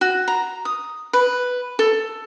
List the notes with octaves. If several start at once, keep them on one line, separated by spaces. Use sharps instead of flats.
F#4
A#5
D#6
B4
A4